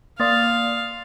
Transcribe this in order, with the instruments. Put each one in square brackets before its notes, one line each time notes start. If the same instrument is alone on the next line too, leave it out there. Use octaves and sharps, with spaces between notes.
[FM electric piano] A#3 D5 [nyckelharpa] F5 [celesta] C6 D#6 A6